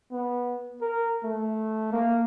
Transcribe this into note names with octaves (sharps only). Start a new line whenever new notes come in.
B3
A#4
A3
A#3